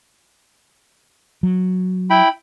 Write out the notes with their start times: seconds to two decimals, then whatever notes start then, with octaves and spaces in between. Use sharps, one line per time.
1.43 F#3
2.10 E4 G5 B5